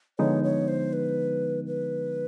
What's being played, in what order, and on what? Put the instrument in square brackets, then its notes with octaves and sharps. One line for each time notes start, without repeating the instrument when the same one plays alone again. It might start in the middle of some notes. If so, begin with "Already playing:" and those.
[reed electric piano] D3 F3 G#3 B3 D#4 [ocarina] C#5
[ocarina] C#5
C5
B4
B4